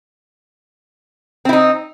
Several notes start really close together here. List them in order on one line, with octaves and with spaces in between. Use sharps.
C4 E4 D#4